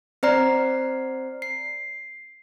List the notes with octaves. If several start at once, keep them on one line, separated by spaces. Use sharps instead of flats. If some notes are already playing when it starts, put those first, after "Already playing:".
C4 C5 D5 A#5 F6 C7
C7